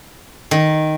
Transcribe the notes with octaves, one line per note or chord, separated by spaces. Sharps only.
D#3